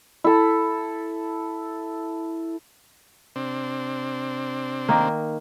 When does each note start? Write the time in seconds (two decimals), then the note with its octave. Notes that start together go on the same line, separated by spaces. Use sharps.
0.24 E4 A4
3.36 C3 C4 D4
4.89 D#3 A#3